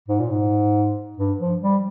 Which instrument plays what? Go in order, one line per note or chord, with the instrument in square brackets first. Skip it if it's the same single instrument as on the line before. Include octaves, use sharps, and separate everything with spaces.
[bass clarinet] G#2
A#2
G#2
G2
F3
G3